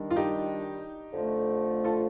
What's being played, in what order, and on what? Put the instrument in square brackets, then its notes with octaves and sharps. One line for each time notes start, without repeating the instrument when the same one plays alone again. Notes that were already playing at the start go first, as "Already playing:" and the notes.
Already playing: [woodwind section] D#3 G3 D4
[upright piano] F4
D#4 G4
[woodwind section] F2 D3 F3 A3
[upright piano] F4 A4